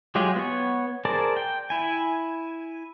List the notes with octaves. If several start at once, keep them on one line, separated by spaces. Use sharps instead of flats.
F#3 G#3 F4 G4 G#4
B3 C#5
G#4 A#4 C5 D5 A5
G5
E4 G#5